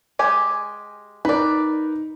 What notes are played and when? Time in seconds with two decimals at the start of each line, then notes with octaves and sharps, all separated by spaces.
0.19 G#3 G4 G#5
1.25 D#4 A#4 B4 D5